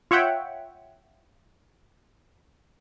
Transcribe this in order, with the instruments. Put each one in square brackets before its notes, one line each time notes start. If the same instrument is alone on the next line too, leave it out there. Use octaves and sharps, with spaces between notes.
[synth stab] F4 C#5 E5 F#5 G5